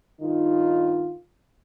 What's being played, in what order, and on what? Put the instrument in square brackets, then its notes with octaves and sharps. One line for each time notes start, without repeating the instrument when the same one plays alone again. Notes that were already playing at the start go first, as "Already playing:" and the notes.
[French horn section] G2 D#3 D#4 F4